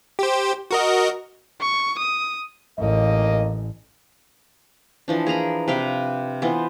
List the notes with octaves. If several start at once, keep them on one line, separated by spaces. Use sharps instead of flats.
G4 C5
F#4 A#4 D#5
C#6
D#6
A1 D#2 A#3 D#5
E3 F3 D4
G#4 A#4 A#5 B5
C3 B4 F5 G5
E3 B3 F4 C5